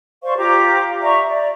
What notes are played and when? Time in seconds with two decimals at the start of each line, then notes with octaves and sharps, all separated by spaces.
0.23 C5 D5 F5 C#6
0.37 F4 G4 A#5 D6
1.01 D5 E5 A#5 C#6
1.25 D5